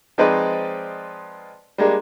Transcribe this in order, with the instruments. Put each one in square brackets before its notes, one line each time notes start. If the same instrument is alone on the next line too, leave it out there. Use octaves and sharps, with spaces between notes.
[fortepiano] F3 G#3 C4 D#4 B4 D5
G3 G#3 A#3 D4